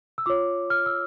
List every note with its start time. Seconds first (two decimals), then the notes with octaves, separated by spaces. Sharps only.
0.18 E6
0.26 F4 C#5 D6
0.70 F6
0.86 E6